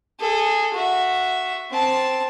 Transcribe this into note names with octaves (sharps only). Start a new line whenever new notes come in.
G#4 A4
F#4 E5
C4 A5